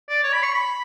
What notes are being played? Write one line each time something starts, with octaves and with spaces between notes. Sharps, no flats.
D5
C#5
B5
C#6
B5